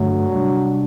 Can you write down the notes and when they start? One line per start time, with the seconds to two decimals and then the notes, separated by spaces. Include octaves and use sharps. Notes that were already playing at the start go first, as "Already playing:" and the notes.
Already playing: G2 D3 F#3 A3
0.26 C3 G3 D4